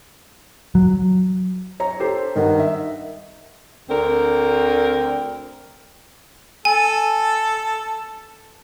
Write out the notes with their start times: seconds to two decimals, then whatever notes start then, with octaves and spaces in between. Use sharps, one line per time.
0.75 F#3
1.80 C#5 A#5
2.00 G4 A4 C5
2.36 G2 D#3 F#5
2.59 E5
3.89 D2 D3 C4 A#4
6.65 A4 G#5